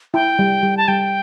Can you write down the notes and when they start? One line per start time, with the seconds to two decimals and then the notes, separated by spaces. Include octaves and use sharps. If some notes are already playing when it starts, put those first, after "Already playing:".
0.14 E4 G5
0.39 G3
0.63 G3
0.77 A5
0.88 G3 G5